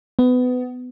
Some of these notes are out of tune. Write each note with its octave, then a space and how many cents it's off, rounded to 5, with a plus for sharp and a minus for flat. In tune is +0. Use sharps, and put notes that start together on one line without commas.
B3 +25